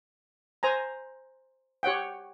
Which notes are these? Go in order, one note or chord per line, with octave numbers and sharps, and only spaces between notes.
C5 G#5 A#5
G4 C#5 F#5 G5